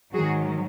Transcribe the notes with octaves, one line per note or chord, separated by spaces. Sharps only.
G#2 D#3 F#3 F#4 G#4